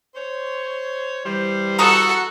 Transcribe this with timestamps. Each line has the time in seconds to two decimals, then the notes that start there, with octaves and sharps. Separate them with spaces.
0.15 C5 C#5
1.25 E3 G3 C5
1.79 F#4 A4 F#5 A#5 D#6